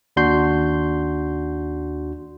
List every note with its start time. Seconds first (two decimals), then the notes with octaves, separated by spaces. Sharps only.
0.16 D#2 D4 F#4 C6 G6